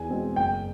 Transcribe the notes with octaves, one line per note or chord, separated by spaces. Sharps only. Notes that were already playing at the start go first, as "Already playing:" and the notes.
Already playing: E2 G#5
B2 G#3 C4
F#1 G5